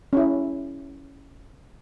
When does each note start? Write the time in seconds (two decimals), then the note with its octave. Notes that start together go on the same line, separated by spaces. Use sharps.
0.13 C#4 E4